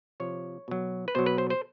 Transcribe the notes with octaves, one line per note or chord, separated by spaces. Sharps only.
C3 F3 C#5
B2 F#3
B4
B2 F#3 C5
B4
C5
C5